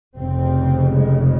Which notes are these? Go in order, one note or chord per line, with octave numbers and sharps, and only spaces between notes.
F1 F2 C#3 C4
G#3